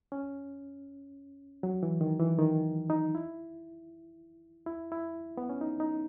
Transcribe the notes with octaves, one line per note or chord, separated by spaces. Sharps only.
C#4
F#3
E3
D#3
E3
D#3
D#4
E4
E4
E4
B3
C#4
D#4
D#4